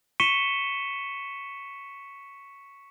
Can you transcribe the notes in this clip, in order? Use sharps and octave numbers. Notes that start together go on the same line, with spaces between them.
C#6 B6 C#7 D#7 E7 G7